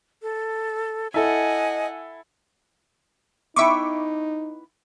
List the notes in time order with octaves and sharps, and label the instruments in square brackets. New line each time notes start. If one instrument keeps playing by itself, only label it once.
[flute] A4
[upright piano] E4 A4 [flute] D#5 [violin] F#5 G#5
[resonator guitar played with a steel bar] B3 E4 G5 [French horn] D#4 [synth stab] E5 C#6 D6